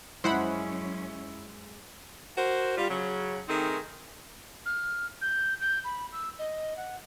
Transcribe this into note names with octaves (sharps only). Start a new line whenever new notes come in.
F#2 G#3 C#4 E4 C5 F#5 B5
F#4 A#4 C5
G3 F4
C#3 F#3
D#3 A3 C4 D#4 G#4
F6
G6
G6
B5
E6
D#5
F#5